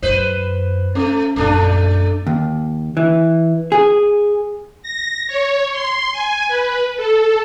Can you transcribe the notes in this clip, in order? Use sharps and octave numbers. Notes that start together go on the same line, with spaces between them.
F#2 B4 C5
A3 C#4
A#1 F#2 A3 D4
D#2
E3
G#4
A#6
C#5
C6
G#5
B4
A4